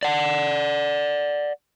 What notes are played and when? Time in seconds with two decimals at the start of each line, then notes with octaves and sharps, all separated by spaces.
0.03 D5 F#5